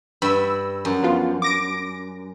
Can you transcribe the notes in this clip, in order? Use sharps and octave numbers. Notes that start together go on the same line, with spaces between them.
G2 B5 E6
F#2
F3 B3 F4
D6 A#6 D7